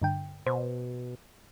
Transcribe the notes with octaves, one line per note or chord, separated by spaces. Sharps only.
G2 D3 G5
B2 C5